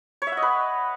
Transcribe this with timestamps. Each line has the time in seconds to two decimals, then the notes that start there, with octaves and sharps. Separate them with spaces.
0.22 C#5
0.27 E5
0.32 F#5
0.37 D#5
0.42 B4